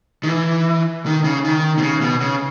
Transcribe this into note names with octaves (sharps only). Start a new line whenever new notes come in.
D#3
E3
D#3
C#3
D#3
B2
C#3
B2
C#3